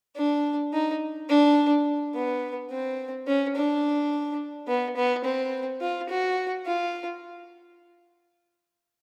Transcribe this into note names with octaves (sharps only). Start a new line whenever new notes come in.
D4
D#4
D4
B3
C4
C#4
D4
B3
B3
C4
F4
F#4
F4